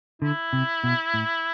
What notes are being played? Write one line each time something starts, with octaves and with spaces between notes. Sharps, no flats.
D3 E4
C3
B2
A2